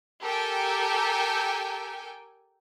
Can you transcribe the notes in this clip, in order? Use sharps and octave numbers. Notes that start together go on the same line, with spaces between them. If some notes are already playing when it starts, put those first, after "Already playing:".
G4 A4 A#4 G5 G#5